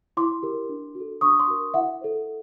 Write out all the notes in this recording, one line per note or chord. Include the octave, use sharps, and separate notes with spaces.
E4 C6 D6
G4 A#4
D4
F#4
A4
D4 C#6 D#6
C6 D6
F#4 A#4
E4 E5 F#5
A4 C5